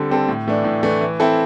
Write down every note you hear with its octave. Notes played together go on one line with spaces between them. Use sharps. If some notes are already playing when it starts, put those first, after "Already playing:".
Already playing: D3 G3 C4 A4
G3 C4 A4
A2
E3 A3 D4
A2
E3 A3 D4
E3
C4 E4 A4